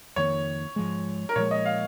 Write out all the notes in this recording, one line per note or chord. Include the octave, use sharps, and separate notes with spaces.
F2 D#3 A#3 C#5
G#2 F3 G#3
A#4
A#2 F3 G#3 C#5
D#5
F5